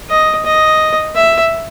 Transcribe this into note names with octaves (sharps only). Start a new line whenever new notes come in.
D#5
D#5
E5